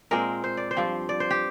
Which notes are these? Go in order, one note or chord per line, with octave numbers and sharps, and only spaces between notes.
A#2 G#3 C4 A#4
C5
D5
C5
G2 F3 C4
D5
C5
G4